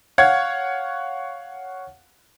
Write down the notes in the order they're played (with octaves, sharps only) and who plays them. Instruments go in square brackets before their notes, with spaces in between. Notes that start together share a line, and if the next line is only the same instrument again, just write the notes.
[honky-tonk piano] C#5 F5 F#5 G#6